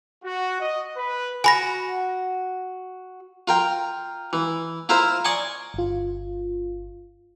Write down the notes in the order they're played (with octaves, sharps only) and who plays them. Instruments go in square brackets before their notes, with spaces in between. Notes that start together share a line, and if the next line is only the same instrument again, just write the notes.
[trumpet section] F#4
D#5
B4
[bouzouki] F#4 [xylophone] G#5 B5 A#6
[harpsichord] F4 A#4 G5
E3
E4 F4 A#4 C5
D5 D#5 G#5 C6 C#6
[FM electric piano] G1 F4